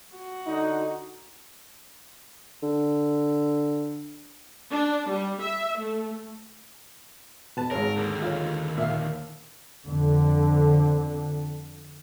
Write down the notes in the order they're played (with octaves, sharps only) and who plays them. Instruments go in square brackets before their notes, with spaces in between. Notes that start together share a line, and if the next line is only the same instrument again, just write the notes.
[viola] F#4
[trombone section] D3 D#4
[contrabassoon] D3
[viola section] D4
G3
E5
A3
[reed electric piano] E2 B2 [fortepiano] B4 A5
[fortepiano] G#1 C#5 [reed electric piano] G#4 [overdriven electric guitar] A#4
[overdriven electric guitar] D#2 D3
[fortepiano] F4 C#5
[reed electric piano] A#2 [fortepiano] E5 F5
[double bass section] F2 D3